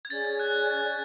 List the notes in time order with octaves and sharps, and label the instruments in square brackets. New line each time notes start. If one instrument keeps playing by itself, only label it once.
[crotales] G#6
[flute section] C#4 G#4 D5 G#5 [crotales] A6
[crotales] G#6
F#6